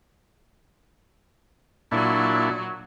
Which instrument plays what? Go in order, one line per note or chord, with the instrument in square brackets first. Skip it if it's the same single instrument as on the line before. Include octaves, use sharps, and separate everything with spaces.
[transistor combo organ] A#2 D4 E4 [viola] F#3 F#4